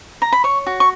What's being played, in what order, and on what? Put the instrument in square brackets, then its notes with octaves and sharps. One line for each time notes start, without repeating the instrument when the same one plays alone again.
[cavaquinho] A#5
B5
C#5 C#6
F#4
C#6